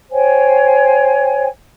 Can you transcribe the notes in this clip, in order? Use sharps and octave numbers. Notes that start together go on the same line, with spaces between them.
C5 C#5 G5 G#5